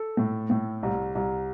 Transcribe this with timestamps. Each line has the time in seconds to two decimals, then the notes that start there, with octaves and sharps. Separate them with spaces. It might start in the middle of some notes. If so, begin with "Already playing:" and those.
Already playing: A4
0.17 A2
0.50 A2
0.83 C2
1.15 C2